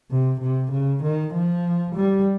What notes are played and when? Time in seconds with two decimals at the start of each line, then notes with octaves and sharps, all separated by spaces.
0.11 C3
0.41 C3
0.72 C#3
1.03 D#3
1.34 F3
1.95 G3